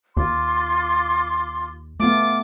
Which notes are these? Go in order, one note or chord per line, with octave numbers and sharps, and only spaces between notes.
D#2 F4 C6 D6
A3 B3 F4 D6